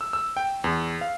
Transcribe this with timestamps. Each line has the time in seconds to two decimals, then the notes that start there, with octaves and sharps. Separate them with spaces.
0.01 E6
0.13 E6
0.37 G5
0.64 E2
1.01 F5